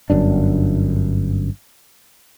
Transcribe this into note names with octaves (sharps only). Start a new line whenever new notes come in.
G1 F#2 D4